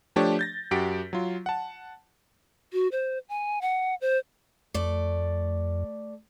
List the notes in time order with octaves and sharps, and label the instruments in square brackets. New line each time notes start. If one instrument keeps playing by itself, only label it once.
[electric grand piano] F3 A3 D4 G4 C#5
G6 A6 A#6
F#2 F#4 G4 B6 D7
F#3 F4
F#5 A5
[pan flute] F#4
C5
G#5
F#5
C5
[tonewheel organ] F2 [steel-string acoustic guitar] A3 D5